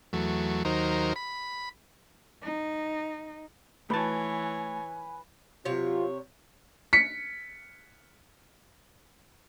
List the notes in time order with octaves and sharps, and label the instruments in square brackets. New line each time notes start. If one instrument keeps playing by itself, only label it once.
[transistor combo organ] E2 F#3 A3
D#2 F#3 D#4 A#4 C5
B5
[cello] D#4
[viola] E3 C#5 [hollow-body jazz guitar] A3 A5 [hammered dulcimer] B4 [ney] G#5
[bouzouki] C3 C#5 [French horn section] F#3 C4 F4
[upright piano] B6 C#7